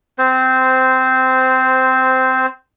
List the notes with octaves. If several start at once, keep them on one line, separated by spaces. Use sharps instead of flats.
C4 C5